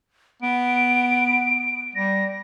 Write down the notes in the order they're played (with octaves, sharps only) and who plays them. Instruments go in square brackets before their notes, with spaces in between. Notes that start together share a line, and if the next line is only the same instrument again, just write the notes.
[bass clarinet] B3 [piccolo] D7
[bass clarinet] G3 [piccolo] A#6